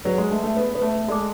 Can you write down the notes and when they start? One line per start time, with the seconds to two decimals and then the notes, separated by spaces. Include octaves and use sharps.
0.04 F#3 G#4 B4 D5
0.18 G#3
0.31 A3
0.43 A3
0.57 B3
0.75 B3
0.82 A3
1.08 G#3 A4 D5 A5 D6